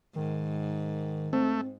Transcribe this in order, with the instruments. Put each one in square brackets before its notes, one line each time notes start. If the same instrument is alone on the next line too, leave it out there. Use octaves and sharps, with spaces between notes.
[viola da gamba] G#2 [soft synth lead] D#3
[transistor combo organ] A3 [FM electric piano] C4